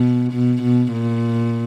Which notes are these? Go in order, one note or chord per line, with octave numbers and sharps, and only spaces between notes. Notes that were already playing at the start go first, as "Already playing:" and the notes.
Already playing: B2
B2
B2
A#2